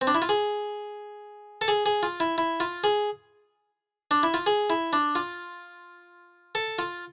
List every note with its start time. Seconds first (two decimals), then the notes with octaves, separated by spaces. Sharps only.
0.01 C4
0.07 D4
0.15 E4
0.22 F4
0.29 G#4
1.61 A4
1.68 G#4
1.86 G#4
2.03 F4
2.20 E4
2.38 E4
2.60 F4
2.84 G#4
4.11 D4
4.23 E4
4.34 F4
4.46 G#4
4.70 E4
4.93 D4
5.15 F4
6.55 A4
6.79 F4